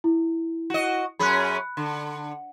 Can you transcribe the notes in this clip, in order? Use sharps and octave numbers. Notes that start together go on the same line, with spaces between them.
E4
F#4 D#5
F#2 C#4 G#4 B5 F#6
D3